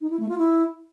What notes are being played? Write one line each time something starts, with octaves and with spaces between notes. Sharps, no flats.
D#4
E4
A3
F4
E4